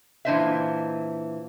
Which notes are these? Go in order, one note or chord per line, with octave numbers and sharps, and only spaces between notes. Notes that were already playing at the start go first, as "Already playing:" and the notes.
A#2 E3 D4 C5 D#5 E5